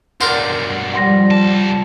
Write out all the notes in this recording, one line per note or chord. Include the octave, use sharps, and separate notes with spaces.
B1 G2 D4 A#4 C5 F#5
F3 G3 F#5 C6 A#6
C2 A5